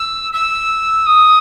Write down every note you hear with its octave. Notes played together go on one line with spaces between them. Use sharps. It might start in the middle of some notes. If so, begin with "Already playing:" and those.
Already playing: E6
E6
D#6